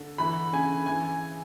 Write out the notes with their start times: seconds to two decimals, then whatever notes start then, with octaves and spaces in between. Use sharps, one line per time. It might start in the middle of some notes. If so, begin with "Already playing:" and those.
Already playing: D3
0.18 E3 B5
0.53 C#3 G#5
0.86 E3 G#5